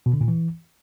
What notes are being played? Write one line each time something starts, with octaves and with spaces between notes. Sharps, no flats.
B2
D3
A#2
E3